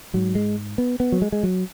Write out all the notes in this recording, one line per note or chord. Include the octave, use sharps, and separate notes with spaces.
G#2 F#3
G#3
B3
B3
F#3
G#3
G#3
F#3